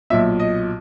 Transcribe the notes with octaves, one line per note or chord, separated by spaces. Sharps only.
B1 A#2 E5
D#5